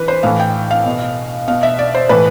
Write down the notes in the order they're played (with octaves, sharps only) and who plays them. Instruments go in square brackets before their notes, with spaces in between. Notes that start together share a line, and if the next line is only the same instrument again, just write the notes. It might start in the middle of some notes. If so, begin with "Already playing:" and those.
Already playing: [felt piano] E3 B4
C5
A2 E3 F5
G5
F5
B2
B2 F5
E5
D5
C5
A2 E3 B4